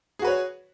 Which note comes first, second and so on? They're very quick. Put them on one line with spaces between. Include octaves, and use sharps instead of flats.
G#4 F#4 B4 C#5